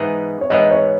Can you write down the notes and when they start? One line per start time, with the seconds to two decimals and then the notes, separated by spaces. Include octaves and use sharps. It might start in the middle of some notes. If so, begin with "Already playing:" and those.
Already playing: G#2 E3 B3 D#4 G#4
0.41 C#5
0.50 G#2 E3 B3 D#4 G#4 D#5
0.71 C#5